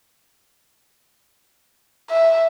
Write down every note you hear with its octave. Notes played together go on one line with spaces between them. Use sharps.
E5